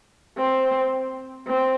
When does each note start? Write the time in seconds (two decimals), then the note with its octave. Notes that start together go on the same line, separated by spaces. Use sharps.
0.38 C4
1.47 C4